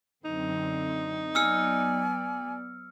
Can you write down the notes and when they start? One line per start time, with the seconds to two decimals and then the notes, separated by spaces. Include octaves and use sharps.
0.24 F#2 D3 C4 D#4
1.35 F#3 B3 D5 G#5 E6 F6 C#7